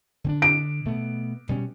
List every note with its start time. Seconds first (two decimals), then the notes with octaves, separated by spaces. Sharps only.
0.24 D3 C4 D4
0.42 D7
0.85 B2 A3 B3
1.49 B2 G3 C#4